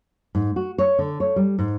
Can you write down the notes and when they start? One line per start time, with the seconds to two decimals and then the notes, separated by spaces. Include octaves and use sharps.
0.35 G#2
0.56 F#4
0.78 C#5
0.99 D3
1.20 C#5
1.36 G3
1.59 G#2